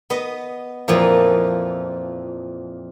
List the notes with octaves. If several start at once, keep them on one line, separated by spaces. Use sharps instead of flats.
B3 D#5
F2 A#2 E3 F3